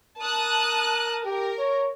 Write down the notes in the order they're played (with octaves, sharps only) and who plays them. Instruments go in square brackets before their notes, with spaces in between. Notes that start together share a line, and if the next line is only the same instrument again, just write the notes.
[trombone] A#4 [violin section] A5 D#6 F#6
[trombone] G4 [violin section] A#4
[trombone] C#5